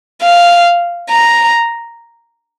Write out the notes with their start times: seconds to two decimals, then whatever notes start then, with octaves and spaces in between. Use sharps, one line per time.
0.22 F5
1.10 A#5